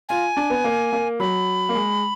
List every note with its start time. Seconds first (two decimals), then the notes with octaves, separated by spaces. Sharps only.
0.09 F4 G#5
0.37 D4
0.50 B3
0.64 A#3
0.93 A#3
1.20 F#3 B5
1.69 A#3
1.75 G#3